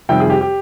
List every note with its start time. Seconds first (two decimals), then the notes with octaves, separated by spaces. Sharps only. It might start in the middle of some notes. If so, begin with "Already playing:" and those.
0.09 F2 C3 D#3 G3 G5
0.20 G#4
0.30 G4
0.41 G4